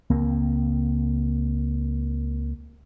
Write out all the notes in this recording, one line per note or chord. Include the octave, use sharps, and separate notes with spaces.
C#2 A#3 C4